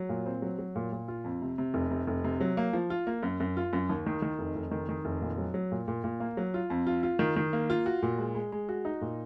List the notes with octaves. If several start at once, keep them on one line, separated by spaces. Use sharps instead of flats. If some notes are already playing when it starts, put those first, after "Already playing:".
Already playing: F#3
A#2
C4
F#3
F#3
A#2
A#2
F4
F2
C3
C3
F1
C3
F1
C3
F#3
A#3
F3
F4
A#3
F#2
F#2
F4
F#2
D#2
D#3
D#3
F1
F1
D#3
D#3
F1
A#2
F#3
F#3
A#2
A#2
A#2
A#3
F#3
F4
F2
F4
F4
D#3
D#3
A#3
F4
F#4
A#2
G#3
G#3
G#3
F#4
D#4
A#2